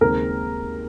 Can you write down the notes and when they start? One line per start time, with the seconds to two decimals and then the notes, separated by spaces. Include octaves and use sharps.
0.01 D#2 C#3 G#3 C4 A#4